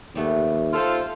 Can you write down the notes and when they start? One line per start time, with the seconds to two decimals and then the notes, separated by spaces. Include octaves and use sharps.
0.15 D#2 G3 A3 B3
0.73 F4 A4 C5